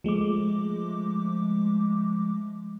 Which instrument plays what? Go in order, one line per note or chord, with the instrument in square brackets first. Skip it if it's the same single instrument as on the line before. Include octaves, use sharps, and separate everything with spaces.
[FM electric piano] F3 G#3 A3 D6